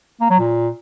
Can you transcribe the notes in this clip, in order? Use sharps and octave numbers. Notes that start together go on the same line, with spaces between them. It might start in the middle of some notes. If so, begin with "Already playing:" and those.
A#3
F#3
A#2